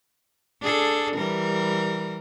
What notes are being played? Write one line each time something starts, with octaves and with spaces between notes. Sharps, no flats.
D4 G#4 A4
E3 G3 A#4